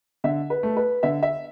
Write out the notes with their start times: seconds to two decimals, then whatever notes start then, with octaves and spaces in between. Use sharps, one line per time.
0.24 D3 E5
0.50 B4
0.63 A3
0.77 B4
1.03 D3 E5
1.23 E5